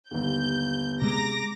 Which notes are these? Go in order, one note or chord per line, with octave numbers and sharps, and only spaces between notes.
G1 D#2 G6
C3 G#3 A#5 D6 A#6